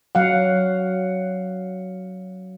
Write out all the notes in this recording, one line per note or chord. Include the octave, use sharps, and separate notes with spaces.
F#3 F5 F#5